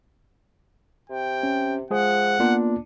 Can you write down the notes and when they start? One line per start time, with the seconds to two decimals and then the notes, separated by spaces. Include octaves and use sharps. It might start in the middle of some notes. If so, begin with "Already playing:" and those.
1.10 C3 G5
1.43 C#4
1.91 F3 G#3 G#4 F#5
2.40 A#3 B3 D4 F4